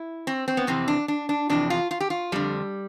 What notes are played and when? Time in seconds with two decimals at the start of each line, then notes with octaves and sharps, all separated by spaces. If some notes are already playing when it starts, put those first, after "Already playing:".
Already playing: E4
0.27 C4
0.48 C4
0.57 B3
0.67 F2 C3 E3 C4
0.88 D4
1.08 D4
1.29 D4
1.49 F2 C3 E3 D4
1.70 F4
1.91 F4
2.00 G4
2.10 F4
2.32 F2 D3 G3